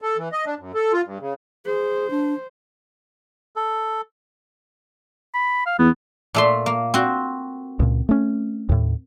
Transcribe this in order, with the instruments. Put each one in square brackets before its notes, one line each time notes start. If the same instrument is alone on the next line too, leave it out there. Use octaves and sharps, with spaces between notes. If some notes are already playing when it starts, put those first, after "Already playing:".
[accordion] A4
E3
D#5
D4
F#2
A4
F4
G2
C#3
[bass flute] G#4 [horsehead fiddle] C5
[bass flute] D4
[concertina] A4
[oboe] B5
F5
[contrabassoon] E2 [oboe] B3
[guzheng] A#2 A3 C6
A#3
C4 F#4
[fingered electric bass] C#2 A#2
A3 C#4
D#2 A2